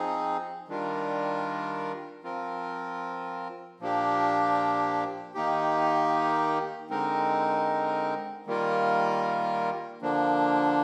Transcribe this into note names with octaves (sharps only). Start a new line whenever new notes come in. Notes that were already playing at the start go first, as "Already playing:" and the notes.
Already playing: F3 C4 D#4 G#4
D#3 G3 D4 F4 A#4
F3 C4 F4 A#4
A#2 F3 A#3 D4 G4
D#3 A#3 D#4 G4
D3 G#3 C4 D#4 A#4
D#3 G3 A#3 F4 A#4
D3 F3 A#3 D4